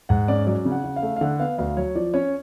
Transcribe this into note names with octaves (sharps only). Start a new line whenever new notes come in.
G#2 F#5
C#4 D5
F#3 D5
C#3
F#5
C#3
F5
A3
F5
D3 F#5
B3 F5
D2 F5
F#3 C#5
F3 D5
C#4 C#5